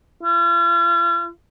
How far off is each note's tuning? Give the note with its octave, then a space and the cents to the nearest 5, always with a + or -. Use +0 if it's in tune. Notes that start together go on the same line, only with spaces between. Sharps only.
F4 -40